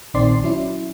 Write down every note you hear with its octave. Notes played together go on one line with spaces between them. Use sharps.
A#1 D#3 C4 D5 C6 C7
F#3 C#4 E4